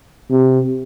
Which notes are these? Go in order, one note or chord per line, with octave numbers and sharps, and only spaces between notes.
C3